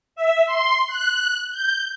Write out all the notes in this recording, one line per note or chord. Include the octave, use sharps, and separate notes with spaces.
E5
C6
F#6
G6